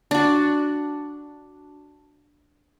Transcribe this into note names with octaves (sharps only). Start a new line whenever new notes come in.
D4 F#4